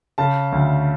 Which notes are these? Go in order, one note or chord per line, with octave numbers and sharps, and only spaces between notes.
C#3 A5
D2